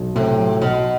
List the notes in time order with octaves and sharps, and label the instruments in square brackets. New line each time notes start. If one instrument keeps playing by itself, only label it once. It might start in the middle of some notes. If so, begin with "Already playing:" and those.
Already playing: [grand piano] B1
[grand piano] A2 [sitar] C3
[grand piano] F#3
[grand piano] B1 [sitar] B2